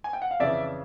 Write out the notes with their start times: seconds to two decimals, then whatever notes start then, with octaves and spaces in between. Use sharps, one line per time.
0.04 G#5
0.13 G5
0.22 F#5
0.31 F5
0.39 F2 C#3 E3 D5 E5